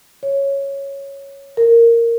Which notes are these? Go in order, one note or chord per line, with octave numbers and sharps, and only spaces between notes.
C#5
A#4